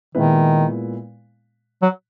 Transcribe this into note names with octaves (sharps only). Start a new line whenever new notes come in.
A#2 D#3 G#3 B3 E4 B4
F#3